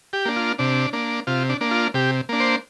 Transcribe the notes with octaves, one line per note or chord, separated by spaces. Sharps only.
G4
A#3 D4
F4
C3 D4
A#3 D4
C3 F4
D4
A#3 D4
F4
C3 G4
A#3 D4
C5